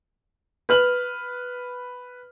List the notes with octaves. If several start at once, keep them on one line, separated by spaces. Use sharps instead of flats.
B4 F6 F#7